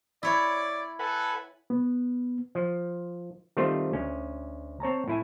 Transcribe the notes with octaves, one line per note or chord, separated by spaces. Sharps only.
E4 C#5 D5
A4 B4 F#5 G#5
B3
F3
D#3 G3 A3 C4 F4 C5
D2 C#4
C4 C#5 A5 A#5
A2 E4 G#5